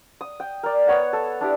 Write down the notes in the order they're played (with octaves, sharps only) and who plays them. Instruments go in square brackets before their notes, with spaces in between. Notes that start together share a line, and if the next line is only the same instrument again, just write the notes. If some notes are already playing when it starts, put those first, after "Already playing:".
[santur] D#6
G5
A#4 D5
B3 C#5 F#5
A4
D4 E4 G4